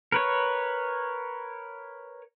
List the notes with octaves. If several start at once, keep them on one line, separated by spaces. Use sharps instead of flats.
A#4 B4 C#5